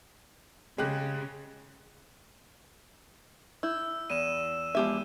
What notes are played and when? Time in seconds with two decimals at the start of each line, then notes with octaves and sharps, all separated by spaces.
0.78 C#3 G#3 G4 F#6
3.63 E4 E6 G6
4.10 E2 D#7 E7
4.75 F3 G#3 B3 E4 G4 E5